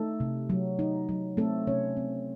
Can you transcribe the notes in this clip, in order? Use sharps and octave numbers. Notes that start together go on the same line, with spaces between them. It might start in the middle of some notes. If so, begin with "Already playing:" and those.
Already playing: A3 D#4 A4
C3
F#3
D#4
F#3
A3 C4 A4
C3 C#4 C#5
C4